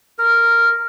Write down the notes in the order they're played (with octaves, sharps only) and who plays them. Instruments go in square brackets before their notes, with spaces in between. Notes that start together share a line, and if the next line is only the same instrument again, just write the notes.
[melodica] A#4